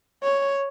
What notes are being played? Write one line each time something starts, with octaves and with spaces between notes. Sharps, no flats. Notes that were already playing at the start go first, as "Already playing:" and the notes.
C#5